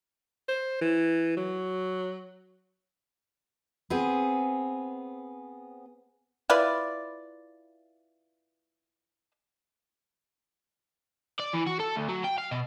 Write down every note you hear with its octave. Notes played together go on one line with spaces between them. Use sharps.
C5
E3
F#3
B3 C4 G#4
E4 F4 B4 D5
D5
E3
F#4
A4
D2
F#3
G5
F5
B2